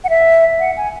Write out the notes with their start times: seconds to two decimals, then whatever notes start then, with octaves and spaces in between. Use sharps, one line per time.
0.04 F#5
0.10 E5
0.60 F#5
0.77 G#5